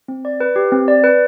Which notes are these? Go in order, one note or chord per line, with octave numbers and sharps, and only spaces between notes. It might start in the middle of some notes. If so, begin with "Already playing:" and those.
C4
D5
B4
G4
C4
D5
B4